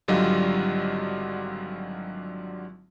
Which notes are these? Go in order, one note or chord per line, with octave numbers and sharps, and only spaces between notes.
G#1 D3 F#3 G3 F4 D#5